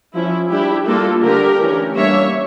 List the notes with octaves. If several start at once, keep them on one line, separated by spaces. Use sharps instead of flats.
F3 C#4 E4
G3 D4 E4 G4
G3 A#3 D4 F4 A4
D3 A3 D4 G4 A#4
E3 A3 C#4
G3 A#3 D4 C#5 E5